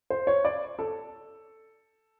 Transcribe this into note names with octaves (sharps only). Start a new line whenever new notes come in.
C5
C#5
D5
A4